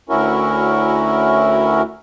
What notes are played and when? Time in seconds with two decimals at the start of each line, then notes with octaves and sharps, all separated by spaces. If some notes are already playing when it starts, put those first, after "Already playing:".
0.09 D2 C#4 E4 F#4 A#4